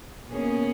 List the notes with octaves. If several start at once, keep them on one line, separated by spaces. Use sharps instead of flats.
B2 A#3 C#4 G#4